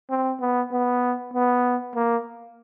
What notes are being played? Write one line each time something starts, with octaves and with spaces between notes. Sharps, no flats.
C4
B3
B3
B3
A#3